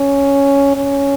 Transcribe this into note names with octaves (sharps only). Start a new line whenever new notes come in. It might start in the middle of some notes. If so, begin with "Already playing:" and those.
Already playing: C#4
C#4